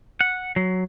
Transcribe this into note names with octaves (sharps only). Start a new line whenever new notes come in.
F#5
F#3